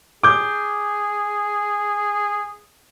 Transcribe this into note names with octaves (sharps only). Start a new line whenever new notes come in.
G#4 D6 G6